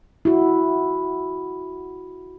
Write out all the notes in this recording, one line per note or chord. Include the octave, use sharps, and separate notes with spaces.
E4 F#4